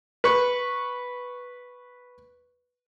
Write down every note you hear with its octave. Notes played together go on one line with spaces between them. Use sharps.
B4 C#6